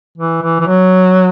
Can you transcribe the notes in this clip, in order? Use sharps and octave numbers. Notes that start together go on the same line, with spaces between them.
E3
E3
E3
F#3